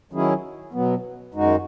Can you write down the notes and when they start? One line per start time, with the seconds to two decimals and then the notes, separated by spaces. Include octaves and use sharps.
0.12 D#3 F#3 C#4 E4 G#4
0.73 B2 F#3 B3
1.34 F#2 D#3 G#3 D#4 F#4